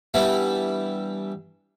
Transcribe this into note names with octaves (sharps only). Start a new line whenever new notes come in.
E3 G3 B3 D4 E4